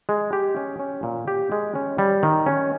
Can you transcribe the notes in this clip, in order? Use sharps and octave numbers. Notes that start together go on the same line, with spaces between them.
G#3
G4
C#4
C#4
A#2
G4
G#3
C#4
G3
D#3
C#4